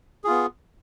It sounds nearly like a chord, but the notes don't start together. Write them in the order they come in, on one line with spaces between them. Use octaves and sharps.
G#4 F4 B3